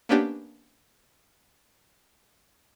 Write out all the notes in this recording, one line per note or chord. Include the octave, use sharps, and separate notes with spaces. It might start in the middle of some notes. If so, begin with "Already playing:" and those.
A#3 B3 C#4 D4 G4